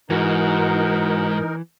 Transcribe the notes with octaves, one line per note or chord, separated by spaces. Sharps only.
G#2 E3 D#4 F#4 A#4